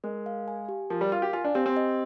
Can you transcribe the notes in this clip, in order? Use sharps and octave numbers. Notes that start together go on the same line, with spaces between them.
G#3 A#4
F5
G#5
G4
F3 A#4
G3
F4 F5
G4
F4 G#5
D4
C4 G4
C4
D#5